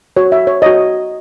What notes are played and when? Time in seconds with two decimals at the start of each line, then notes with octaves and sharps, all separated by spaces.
0.17 F#4 C#5
0.32 E5
0.47 C#5
0.62 F#4 C#5 D#5